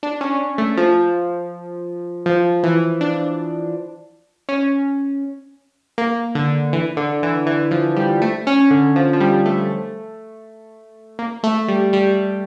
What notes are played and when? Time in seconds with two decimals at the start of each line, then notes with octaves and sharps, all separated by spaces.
0.03 D4
0.21 C#4
0.58 A3
0.77 F3
2.26 F3
2.63 E3
3.01 D4
4.49 C#4
5.98 A#3
6.35 D3
6.73 E3
6.97 D3
7.23 E3
7.46 E3
7.71 F3
7.96 G3
8.22 A3
8.47 C#4
8.71 D3
8.96 F3
9.13 F3
9.21 G3
9.46 A3
11.19 A#3
11.43 A3
11.68 G3
11.93 G3